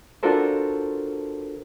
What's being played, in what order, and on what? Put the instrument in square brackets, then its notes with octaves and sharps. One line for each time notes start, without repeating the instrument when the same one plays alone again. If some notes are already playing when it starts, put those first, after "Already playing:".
[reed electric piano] D4 F4 F#4 A4 A#4 C5